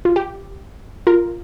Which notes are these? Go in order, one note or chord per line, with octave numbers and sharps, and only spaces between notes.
F4
G4
F4 A#4